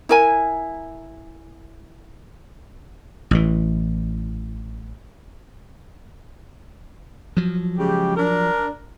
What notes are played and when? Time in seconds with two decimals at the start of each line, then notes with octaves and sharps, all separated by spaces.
0.09 E4 A#4 G#5
3.31 A1 E3
7.37 F3 F#3
7.78 C#3 G#3 G4
8.16 D4 A#4